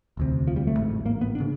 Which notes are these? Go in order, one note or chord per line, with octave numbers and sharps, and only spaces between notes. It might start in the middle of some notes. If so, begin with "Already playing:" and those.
E1 D2 C3
F3
G3
A3
A1 G#2
A#3
B3
D4
C#3